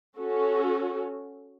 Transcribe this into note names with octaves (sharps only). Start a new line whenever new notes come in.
C#4 F#4 A4